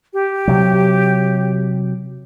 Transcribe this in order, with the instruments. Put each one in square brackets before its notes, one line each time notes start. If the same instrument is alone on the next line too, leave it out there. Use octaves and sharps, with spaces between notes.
[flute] G4
[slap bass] C3 F#3